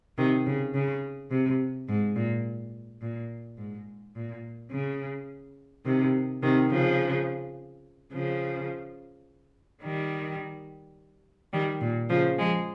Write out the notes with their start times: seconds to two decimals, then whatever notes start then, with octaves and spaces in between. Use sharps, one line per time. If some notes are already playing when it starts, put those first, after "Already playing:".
0.17 C3 D#3
0.46 C#3
0.74 C#3
1.31 C3
1.88 G#2
2.16 A#2
3.01 A#2
3.57 G#2
4.15 A#2
4.71 C#3
5.85 C3 D#3
6.42 C3 D#3
6.70 C#3 F3
8.12 C#3 F3
9.83 D#3 G3
11.53 D#3 G3
11.81 A#2
12.10 C#3 F3
12.38 F3 G#3